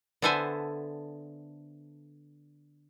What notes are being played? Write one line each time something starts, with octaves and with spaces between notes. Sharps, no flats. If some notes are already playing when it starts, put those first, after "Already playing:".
D3 B3 A4 C5 E5 G#5